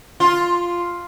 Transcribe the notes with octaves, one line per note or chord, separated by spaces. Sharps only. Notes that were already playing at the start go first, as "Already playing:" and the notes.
F4